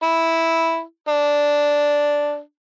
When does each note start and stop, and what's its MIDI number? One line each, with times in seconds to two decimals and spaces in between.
0.03 0.82 64
1.08 2.40 62